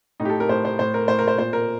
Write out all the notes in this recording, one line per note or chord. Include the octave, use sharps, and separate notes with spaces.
A2 D#4
G4
A4
A#4
A2 C5
C5
A2 C5
A#4
A2 C5
A#4
C5
A#2 C5
A#4